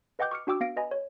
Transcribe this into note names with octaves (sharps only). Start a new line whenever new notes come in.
B4 D#5 F#5 G5 D6 G6
C#6 D6 F6 C#7
D4 F#4 G5 D6 E6
B3 F5 A#6 D7
B4 D#5 G#5 B5
C#5